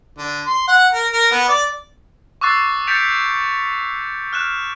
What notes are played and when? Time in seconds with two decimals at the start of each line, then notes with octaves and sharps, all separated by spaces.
0.18 D3
0.46 C6
0.68 F#5
0.93 A#4
1.13 A#4
1.31 B3
1.48 D5
2.41 C#6 D6 E6 F#6 A6 C7
2.87 G6 A6 B6 C#7 D7 F7
4.33 F6 F#6 E7